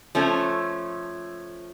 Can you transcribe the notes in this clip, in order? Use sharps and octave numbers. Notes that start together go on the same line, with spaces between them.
F3 A3 C#4